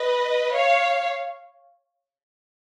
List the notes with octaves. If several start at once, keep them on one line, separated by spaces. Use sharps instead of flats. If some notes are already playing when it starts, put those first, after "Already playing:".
Already playing: B4 D#5
C#5 F5